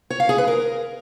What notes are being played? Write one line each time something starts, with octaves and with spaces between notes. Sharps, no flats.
C#5
F5
G#4
B4
A#4